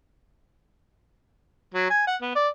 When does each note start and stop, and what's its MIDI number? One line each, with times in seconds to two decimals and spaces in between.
1.74 1.85 54
1.90 2.05 80
2.07 2.16 78
2.22 2.32 59
2.35 2.48 74